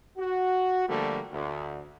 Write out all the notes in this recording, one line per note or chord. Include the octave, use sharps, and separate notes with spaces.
F#4
D3 F3 G3 A3 A#3
D2